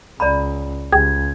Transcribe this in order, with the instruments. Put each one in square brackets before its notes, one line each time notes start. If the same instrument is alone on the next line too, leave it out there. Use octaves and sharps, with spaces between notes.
[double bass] C#2 [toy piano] D5 A#5 B5
[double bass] C#2 [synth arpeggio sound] G4 G#4 [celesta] G#6